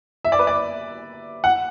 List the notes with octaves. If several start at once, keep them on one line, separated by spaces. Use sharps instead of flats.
E5
D5
B4
D5
F#5